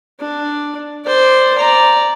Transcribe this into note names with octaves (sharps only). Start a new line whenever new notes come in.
D4
C5 D5
D5 A#5